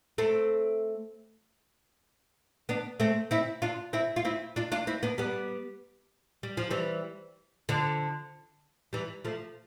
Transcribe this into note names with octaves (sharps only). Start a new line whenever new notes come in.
A3 C4
B3 D4
A3 C4
C4 E4
D4 F4
C4 E4
F4
C4 E4
D4 F4
D4 F4
C4 E4
B3 D4
G3 B3
G3
F3
E3 G3
D3 F3
E3 G3
F3 A3